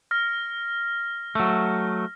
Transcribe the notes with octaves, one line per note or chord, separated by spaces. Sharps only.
F6 A#6
F#3 A3